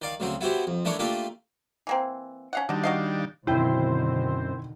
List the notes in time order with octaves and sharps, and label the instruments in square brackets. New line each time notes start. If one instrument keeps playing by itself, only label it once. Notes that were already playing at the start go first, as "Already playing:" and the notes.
[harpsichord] D#3 D5 F5
D2 C#3 F#3 C4
B3 E4 F#4 G4 C5
F2
D3 E3 A3 D4 A#4 C#5
A3 A#3 D4 F4 G4 A4
[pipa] E3 A#3 C4
C#4 F5 F#5
[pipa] D3 F#4 [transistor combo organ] D#3 G3 D4
[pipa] F#4 D#5 F5
[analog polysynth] F#2 C4 C5 [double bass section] B2 D3 D#3 [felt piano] E4 G5